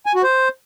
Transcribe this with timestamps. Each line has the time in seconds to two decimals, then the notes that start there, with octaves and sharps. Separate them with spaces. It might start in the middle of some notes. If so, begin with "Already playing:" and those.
0.06 G#5
0.15 F#4
0.23 C5